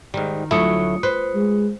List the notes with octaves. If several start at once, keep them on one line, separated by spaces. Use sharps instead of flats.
G#2 D#3 G3
D2 F#3 A3 E4 F4 D#6 C#7
B4 C5
G#3